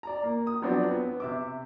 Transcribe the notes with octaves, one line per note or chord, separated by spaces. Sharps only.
D5 A#5
A#3
D#6
F3 F#3 B3 C4 D4
B3
C3 E5 D6